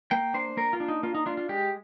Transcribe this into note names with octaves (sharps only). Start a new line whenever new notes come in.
A#3 G5
D4 C5
A#3 A#4
F4
D4
D#4
A#3 F4
D#4
D4 F4
F4
G#3 G4